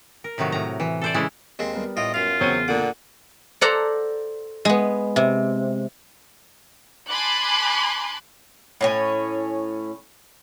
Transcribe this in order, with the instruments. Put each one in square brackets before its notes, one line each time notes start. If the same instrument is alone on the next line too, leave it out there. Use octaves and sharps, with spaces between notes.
[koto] A#4
A2 C3 D#3 F#3
A2 A#5
E3
A4 C5 D5
C#3 E3 G#3 E4
[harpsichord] D#2 G#3 C4
[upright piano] G3 B3 A#4
[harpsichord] A2 F4 G5 [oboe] D#5
[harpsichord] F#2 F5 [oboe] F4
[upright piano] E2 C#3 D#7 [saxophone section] F#3 C4 C#5
[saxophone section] A#2 D3 F#5 [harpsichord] D6
[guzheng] A4 C5 D5 F#5 A#5
G#3 B3
C3
[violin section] G#5 A5 B5 C6 D6 F#6
[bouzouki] A2 C#4 G#5